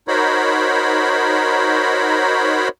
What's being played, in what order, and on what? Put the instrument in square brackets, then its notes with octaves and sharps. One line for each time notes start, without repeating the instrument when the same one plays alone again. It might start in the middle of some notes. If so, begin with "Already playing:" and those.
[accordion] D#4 F#4 A#4 C5 C#5 B5